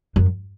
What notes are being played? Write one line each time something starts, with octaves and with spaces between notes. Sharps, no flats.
F#2